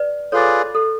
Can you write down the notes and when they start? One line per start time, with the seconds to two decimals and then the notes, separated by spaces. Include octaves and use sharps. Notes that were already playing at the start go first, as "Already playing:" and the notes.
Already playing: B4 D5
0.32 F4 G#4 A4 B4 C#5 D5
0.75 A4